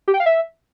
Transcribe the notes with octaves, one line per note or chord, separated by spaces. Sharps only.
G4
G5
F5
E5